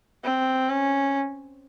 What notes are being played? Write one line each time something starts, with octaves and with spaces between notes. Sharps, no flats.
C4
C#4